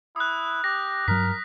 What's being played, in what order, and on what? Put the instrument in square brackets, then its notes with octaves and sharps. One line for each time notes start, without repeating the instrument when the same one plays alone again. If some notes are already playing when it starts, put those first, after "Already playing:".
[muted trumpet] E4 [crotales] D#6 F#6
[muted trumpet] G4 [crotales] A#6
[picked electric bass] G2 F#3 [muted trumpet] A#4 [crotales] B6